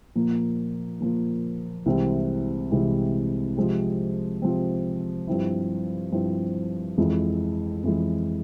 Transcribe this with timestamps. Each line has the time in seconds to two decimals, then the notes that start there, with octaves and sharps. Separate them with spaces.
0.16 A#2 F3 A#3
1.00 A#2 F3 A#3
1.86 C2 C3 E3 G#3 C4
2.71 C2 C3 E3 G#3 C4
3.57 C3 F3 G#3 C4
4.42 C3 F3 G#3 C4
5.27 G2 F3 C4 E4
6.12 G2 F3 C4 E4
6.97 F2 E3 G#3
7.83 F2 E3 G#3